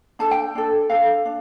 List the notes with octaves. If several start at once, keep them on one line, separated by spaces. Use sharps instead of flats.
D4 A4 A5
G5
D4 A4
D4 A4 F5
D4